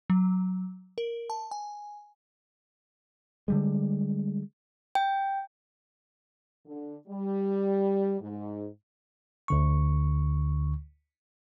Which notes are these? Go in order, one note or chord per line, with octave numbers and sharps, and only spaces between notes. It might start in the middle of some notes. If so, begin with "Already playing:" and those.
F#3
A#4
A5
G#5
D3 G3 G#3
G5
D3
G3
G#2
D2 D3 C#6